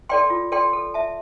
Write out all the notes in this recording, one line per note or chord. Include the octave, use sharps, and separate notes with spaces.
A4 D5 G5 C6
F4
A4 D5 G5 C6
A4
E5 A5